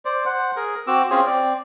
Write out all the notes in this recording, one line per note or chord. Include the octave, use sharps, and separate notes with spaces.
C5 D5
C5 F#5
G#4 A#4
C4 F#4 D6 E6
C4 C#4 F4 G#4
C4 D5